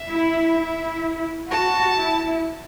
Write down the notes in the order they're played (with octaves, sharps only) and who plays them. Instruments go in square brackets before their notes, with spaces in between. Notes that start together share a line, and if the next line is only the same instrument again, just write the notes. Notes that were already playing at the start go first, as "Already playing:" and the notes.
Already playing: [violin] E5
[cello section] E4
E4
[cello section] F#4 [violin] A5
[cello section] E4